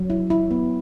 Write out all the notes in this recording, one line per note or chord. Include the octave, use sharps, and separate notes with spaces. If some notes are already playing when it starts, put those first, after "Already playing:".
Already playing: F#3
E4
E4
B3